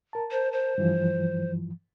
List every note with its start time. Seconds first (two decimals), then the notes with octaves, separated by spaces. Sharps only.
0.13 A#4 A5
0.31 C5
0.53 C5
0.78 G2 E3 F3